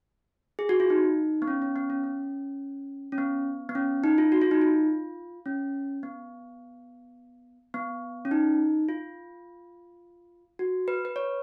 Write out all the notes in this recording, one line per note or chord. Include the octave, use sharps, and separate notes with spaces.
G#4
F#4
F4
D#4
B3
C#4
C#4
B3
C#4
C#4
C#4
B3
B3
C#4
D#4
F4
F#4
F4
D#4
F4
C#4
B3
B3
C#4
D#4
F4
F#4
B4
B4
C#5